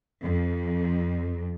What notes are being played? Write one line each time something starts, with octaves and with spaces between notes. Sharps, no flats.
F2